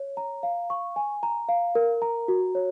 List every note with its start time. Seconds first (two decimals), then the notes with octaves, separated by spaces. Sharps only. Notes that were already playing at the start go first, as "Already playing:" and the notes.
Already playing: C#5
0.17 A#5
0.43 F5
0.70 C#6
0.96 G#5
1.23 A#5
1.49 F5
1.75 A#4
2.02 A#5
2.28 F#4
2.55 C#5